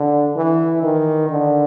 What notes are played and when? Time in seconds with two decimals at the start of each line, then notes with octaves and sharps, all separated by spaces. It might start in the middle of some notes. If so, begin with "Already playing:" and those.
Already playing: D3
0.36 E3
0.83 D#3
1.29 D3